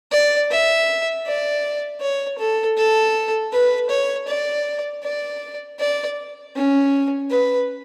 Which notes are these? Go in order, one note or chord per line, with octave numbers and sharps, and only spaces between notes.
D5
E5
D5
C#5
A4
A4
B4
C#5
D5
D5
D5
C#4
B4